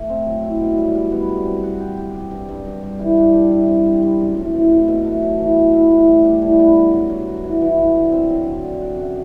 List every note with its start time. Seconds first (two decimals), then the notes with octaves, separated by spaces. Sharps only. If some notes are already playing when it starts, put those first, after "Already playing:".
Already playing: A3
0.09 C4
0.26 F#3
0.43 E4
0.60 B2
0.78 G3
0.95 G3
1.12 B3
1.29 G3
1.46 C4
1.63 F#4
1.80 G4
1.97 G4
2.14 G4
2.31 G2
2.49 G2
2.65 G2
2.83 G3
2.99 E3
3.18 D4
3.34 G4
3.51 E4
3.68 C4
3.86 G3
4.02 G3
4.20 F#2
4.37 A2
4.54 E3
4.71 A2
4.88 B2
5.04 A3
5.23 F#3
5.39 E3
5.56 B3
5.73 E4
5.91 A2
6.08 G3
6.25 D4
6.42 E3
6.59 B3
6.76 F#4
6.93 F#3
7.10 F#3
7.27 F#4
7.44 E3
7.62 E3
7.78 E3
7.96 D3
8.12 C4
8.30 F#3
8.47 D3
8.64 D3
8.81 F#4
8.98 F#2